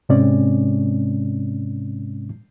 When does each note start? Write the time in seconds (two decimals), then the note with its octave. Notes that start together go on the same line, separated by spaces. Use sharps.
0.09 G#2 C3 G#3 C4 C#4 D5